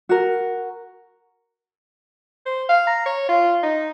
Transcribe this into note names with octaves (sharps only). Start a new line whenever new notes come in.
F#4 A#4
C5
F5
A#5
C#5
F4
D#4